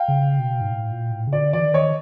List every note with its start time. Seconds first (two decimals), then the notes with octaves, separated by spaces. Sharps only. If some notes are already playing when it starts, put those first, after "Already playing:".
Already playing: F5 G5
0.08 C#3
0.39 B2
0.61 G#2
0.70 A2
0.91 A#2
1.12 A2
1.27 C#3
1.33 D3 D5
1.53 E3 D5
1.64 D#3
1.74 C#5 D#5